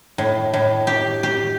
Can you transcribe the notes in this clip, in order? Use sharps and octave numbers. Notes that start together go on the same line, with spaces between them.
A2
A2
G4
G4